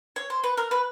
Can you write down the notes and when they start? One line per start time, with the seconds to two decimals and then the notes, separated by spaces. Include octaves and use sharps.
0.16 C#5
0.30 C5
0.44 B4
0.58 A#4
0.71 B4